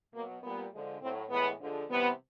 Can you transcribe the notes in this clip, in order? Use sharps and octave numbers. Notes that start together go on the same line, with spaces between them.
B2 F#3 A#3
A#2 G3 B3
D3 F3 G#3
A2 F#3 C4
A2 E3 G#3 B3
D3 F3 G#3
C3 E3 G3 B3